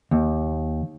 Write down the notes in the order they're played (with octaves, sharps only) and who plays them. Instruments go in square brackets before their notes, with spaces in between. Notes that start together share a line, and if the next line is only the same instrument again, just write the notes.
[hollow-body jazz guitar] D#2